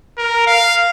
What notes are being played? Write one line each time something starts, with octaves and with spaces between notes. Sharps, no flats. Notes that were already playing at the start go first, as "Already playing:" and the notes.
A#4
F5